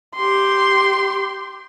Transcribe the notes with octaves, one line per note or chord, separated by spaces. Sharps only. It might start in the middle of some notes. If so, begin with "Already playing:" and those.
G4 C6